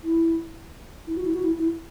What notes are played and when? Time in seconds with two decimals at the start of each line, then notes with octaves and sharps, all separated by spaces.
0.03 E4
1.07 E4
1.16 F#4
1.25 E4
1.34 F#4
1.43 E4
1.59 E4